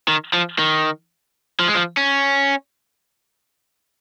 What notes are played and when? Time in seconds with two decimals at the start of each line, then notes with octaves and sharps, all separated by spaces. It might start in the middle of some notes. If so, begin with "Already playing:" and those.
0.08 D#3
0.33 F3
0.59 D#3
1.60 F3
1.68 G#3
1.75 F3
1.97 C#4